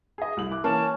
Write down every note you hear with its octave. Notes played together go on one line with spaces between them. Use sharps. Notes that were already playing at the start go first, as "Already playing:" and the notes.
G#4 D#5
C2 F#7
E5 D6 F#6
E3 A#3 C#4 A5